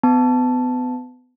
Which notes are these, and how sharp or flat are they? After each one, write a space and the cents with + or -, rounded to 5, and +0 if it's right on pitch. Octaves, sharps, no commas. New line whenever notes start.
B3 +30 A5 +0